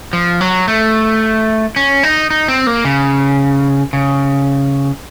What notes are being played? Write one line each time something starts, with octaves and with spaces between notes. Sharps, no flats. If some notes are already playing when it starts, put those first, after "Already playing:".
F3
F#3
A3
C#4
D#4
D#4
C4
A#3
C#3
C#3